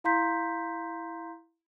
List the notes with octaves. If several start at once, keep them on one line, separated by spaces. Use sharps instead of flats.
E4 F5 A#5 C6 G6 B6